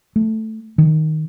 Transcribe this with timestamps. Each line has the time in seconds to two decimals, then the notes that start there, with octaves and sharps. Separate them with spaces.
0.16 A3
0.78 D#3